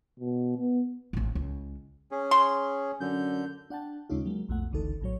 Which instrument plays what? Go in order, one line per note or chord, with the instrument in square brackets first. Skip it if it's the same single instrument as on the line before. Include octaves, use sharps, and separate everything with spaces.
[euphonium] B2
B3
[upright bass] A1 C4
C#2
[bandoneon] C#4 G#4
[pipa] C6
[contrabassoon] F#2 [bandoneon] D3 G6
[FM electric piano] D4 F#5 G5 A5
D#2 C#3 G#3 C#4 D#4 F4
F#3 G#3 A#3
B1 F2 A3 F#5
G1 C#2 D3 E3 D#4 A4
A#1 A2 F#3 C#5